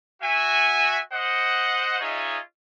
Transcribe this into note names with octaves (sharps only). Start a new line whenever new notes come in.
F#4 E5 G#5
C5 D#5 F#5
D#4 F4 G#4 C#5 D#5 E5